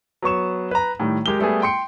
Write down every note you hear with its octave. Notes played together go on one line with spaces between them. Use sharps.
F#3 B3 C#6 E7
B4 A#5
A2 D#3 G3
G#3 G4 A#4 G7
G3 A3 B3 G#4
G5 C6 C#7